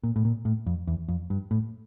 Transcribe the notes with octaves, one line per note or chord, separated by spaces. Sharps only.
A#2
A2
A#2
A2
F2
E2
F2
G2
A2